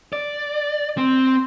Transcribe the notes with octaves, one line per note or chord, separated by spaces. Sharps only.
D5
C4